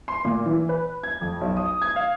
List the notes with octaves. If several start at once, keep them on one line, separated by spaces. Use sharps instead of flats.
C6
A#2
E3
B4
G#6
F2
B1
D#6
G#6
F5